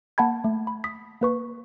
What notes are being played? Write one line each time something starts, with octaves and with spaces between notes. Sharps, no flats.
A#3 F#5 A5 B5 G#6
A3
B5
D#6 B6
A#3 B4 C#6